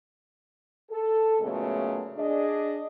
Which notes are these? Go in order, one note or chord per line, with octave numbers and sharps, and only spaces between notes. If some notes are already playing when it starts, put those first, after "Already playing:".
A4
A#2 C#3 F#3 G#3 A3 B3
D4 G#4 D#5